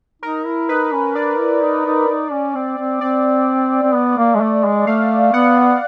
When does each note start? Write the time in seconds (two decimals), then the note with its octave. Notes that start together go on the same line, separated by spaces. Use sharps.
0.22 D#4 A#4
0.45 E4
0.69 D#4 B4
0.92 C#4
1.15 D4 D5
1.38 E4
1.61 D#4
1.85 D#4
2.08 D#4
2.31 C#4
2.55 C4
2.78 C4
3.01 C4 D5
3.83 C4
3.94 B3
4.17 A#3
4.35 G#3
4.40 A3
4.64 G#3
4.87 A3 F5
5.33 B3 F#5